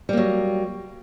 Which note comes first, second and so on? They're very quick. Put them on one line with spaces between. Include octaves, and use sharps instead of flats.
G3 A#3 F#3